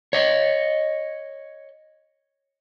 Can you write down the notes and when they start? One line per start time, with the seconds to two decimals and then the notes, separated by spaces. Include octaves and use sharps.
0.13 C#5 D#5